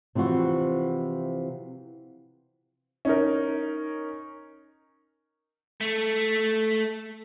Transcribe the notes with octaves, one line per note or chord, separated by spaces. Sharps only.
C3 E3 F3 F4 F#4
C#4 D#4 A#4
A3